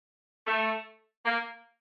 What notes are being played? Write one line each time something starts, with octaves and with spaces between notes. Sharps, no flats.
A3
A#3